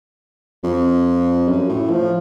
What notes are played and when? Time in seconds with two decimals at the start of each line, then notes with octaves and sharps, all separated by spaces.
0.63 F2
1.48 F#2
1.69 A2
1.90 F3